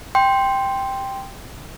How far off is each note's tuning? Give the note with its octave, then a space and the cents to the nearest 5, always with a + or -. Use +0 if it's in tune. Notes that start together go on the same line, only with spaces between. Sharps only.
G5 +0 C6 +0